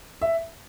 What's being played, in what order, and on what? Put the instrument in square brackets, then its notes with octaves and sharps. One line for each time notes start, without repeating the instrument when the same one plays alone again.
[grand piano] E5